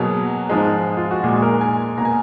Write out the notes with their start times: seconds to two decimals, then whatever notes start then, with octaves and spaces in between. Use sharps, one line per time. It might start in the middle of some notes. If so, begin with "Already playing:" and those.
Already playing: B2 F#3 A#3 G#4
0.49 G#2 F3 G#3
0.97 F4
1.11 F#4
1.24 A#2 G#3 G#4
1.42 A#4
1.61 G#5
1.98 B2 A#3 A#5
2.05 G#5